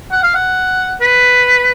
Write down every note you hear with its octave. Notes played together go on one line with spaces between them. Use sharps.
F#5
F5
F#5
B4